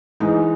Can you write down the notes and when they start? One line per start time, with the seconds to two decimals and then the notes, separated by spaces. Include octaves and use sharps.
0.20 G#2 E3 G#3 D#4